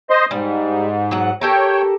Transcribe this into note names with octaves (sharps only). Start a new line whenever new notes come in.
C5 D#5 C6
G#2 G3
F#3 F#5
G4 A4 A#4 C#5 G5